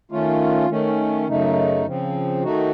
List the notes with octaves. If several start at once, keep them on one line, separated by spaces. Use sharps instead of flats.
D#3 A3 C#4 F4
D#3 A3 C#4
F#2 C#3 A3 D#4
C#3 F3 C4
D#3 A3 D#4 F#4